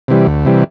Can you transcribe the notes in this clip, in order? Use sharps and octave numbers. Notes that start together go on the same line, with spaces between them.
C3 E3 G3
D2
C3 E3 G3